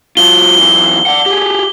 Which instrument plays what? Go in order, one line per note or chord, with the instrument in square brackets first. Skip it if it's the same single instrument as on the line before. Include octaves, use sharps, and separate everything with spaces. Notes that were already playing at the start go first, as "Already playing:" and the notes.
[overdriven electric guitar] F#3 F4 [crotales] G7
[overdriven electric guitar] F#2 E3
D5 F#5
G4 G#4